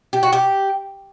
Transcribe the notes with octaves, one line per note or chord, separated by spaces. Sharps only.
G4
F#4
G4